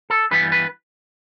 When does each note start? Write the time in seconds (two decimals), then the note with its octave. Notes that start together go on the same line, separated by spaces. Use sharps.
0.10 A4
0.31 G2 E3 G3 B3 B4
0.52 B4